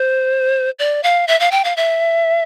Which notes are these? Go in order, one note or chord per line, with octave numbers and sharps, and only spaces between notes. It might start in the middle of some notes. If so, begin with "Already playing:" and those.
Already playing: C5
D5
F5
E5
F5
G5
F5
E5